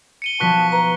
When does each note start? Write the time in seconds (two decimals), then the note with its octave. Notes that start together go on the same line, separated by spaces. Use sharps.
0.22 C#7 D#7 G7
0.40 B2 F3 B3 A5 C#6 F#6 B6
0.72 B4 A#5